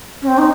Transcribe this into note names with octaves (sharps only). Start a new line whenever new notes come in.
C#4
C4
D#4